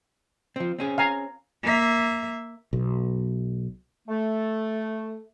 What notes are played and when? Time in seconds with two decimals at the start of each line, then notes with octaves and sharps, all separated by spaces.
0.56 F3 C4
0.79 C4 C#4 G#4
0.98 F5 G#5 A#5
1.63 A#3 E5
2.73 B1
4.09 A3